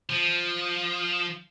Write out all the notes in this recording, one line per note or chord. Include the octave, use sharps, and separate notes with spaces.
F3